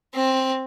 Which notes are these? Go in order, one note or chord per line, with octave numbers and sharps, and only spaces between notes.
C4